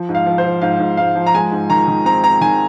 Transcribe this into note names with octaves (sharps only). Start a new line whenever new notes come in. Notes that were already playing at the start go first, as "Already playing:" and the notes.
Already playing: F3
G#2
F5
F3
C5
F3
G#2 F5
G#2
G#2 F5
F3
A#5
G#3 G#5
G#2
D#3 A#5
D#3
C4 A#5
C4 A#5
D#3 G#5